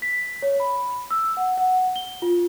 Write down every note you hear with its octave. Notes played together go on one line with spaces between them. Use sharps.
B6
C#5
B5
E6
F#5
F#5
G7
F4